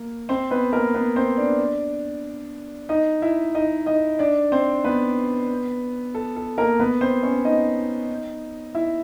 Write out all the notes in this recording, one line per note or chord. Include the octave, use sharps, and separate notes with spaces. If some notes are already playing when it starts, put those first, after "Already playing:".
Already playing: A#3
C4 C5
B3 B4
A#3 A#4
B3 B4
C4 C5
D4 D5
D#4 D#5
E4 E5
D#4 D#5
D#4 D#5
D4 D5
C4 C5
B3 B4
A4
A4
A#3 A#4
B3 B4
C4 C5
C#4 C#5
D#4 D#5
E4 E5